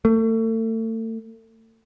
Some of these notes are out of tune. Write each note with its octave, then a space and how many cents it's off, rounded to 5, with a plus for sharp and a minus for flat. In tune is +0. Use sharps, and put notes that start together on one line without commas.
A3 +35